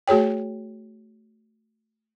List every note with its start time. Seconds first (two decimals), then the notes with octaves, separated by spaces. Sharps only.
0.08 A3 F#4 G#4 C#5 G5